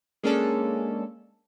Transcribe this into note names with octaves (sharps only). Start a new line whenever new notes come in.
G#3 A#3 C#4 D4 A4